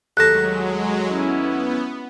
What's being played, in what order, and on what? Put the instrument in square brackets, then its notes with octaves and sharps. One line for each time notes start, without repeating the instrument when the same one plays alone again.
[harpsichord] D#2 A3 A5 [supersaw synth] F#3 G#3 [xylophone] F#6 A#6
[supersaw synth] B3 [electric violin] C#4 E4